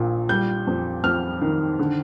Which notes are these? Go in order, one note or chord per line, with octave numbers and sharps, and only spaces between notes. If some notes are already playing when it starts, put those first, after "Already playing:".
Already playing: A#1 A#2
G3 G6
F2
F2 F6
D#3
D3